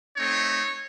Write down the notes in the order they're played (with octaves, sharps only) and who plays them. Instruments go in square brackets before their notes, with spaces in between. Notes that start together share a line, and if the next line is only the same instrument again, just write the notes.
[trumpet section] A3 C4 D#4 C#5